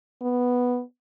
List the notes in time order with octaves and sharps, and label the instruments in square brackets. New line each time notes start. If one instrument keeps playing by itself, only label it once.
[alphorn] B3